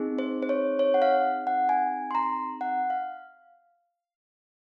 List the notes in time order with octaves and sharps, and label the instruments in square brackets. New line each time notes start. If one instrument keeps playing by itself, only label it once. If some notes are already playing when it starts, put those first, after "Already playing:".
Already playing: [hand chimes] C4 D#4 G#4
C5
C5
C#5
C#5
F#5
F5
F#5
G#5
C6
A#5
F#5
F5